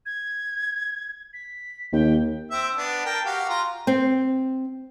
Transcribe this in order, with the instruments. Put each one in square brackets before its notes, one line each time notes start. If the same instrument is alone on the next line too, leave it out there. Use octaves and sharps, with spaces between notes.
[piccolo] G#6
B6
[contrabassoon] D#2 [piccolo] G5
[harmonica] C4 E5
B3 D4
A#4 G5 A5
F#4 G4 F5
F4 A#5
[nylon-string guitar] C4